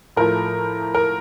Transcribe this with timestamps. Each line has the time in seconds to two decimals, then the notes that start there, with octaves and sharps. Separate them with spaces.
0.16 A2 F3 A3 A#4
0.95 A#4